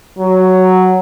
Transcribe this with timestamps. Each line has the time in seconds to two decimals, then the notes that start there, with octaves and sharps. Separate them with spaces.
0.18 F#3